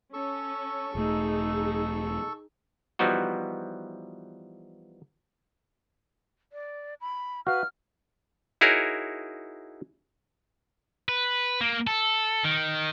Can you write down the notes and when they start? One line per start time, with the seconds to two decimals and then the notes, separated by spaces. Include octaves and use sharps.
0.13 C#4 A4 C#6 E6
0.95 E1 A3 D#4 G#4
2.99 E3 F3 G3 B3 D#4 F#4
6.53 D5
7.01 B5
7.47 F#4 B4 F5 F6
8.61 D#4 E4 F#4 G#4 A#4 C#5
11.09 B4
11.61 A#3
11.87 A4
12.44 D#3